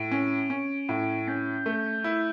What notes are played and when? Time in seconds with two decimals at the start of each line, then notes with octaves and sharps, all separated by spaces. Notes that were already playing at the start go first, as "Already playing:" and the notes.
Already playing: A2 D7
0.11 C#4
0.50 C#4
0.89 A2
1.27 C#4 G6
1.66 A3
2.04 E4